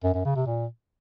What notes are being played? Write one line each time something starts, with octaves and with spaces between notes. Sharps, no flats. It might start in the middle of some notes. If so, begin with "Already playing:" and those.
F#2
F#2
C#3
C3
A#2